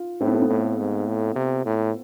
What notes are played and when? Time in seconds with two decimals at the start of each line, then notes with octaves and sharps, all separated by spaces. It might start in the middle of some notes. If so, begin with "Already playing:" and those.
Already playing: F4
0.20 A2 C4
0.27 B3
0.35 A3
0.42 B3
0.49 A2
0.78 G#2
1.07 A2
1.35 C3
1.65 A2